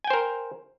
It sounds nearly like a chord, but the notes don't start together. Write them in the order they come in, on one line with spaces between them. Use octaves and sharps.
G#5 G5 C5 A#4